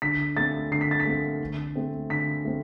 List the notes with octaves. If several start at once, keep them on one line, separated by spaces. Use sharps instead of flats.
D3 B6
A3 C4 A6
D3 C7
B6
A6
B6
A3 C4
D3
A3 C4
D3 B6
A3 C4